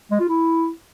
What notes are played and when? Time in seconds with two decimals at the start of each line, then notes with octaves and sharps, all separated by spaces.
0.11 G#3
0.20 F4
0.29 E4